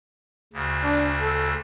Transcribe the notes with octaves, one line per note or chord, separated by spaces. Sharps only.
D2 C#3
D4
A4